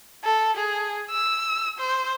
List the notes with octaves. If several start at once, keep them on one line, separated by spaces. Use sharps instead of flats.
A4
G#4
E6
C5